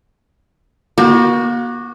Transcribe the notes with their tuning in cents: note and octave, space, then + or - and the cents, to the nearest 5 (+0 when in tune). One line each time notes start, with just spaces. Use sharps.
A#3 +40 F#4 +0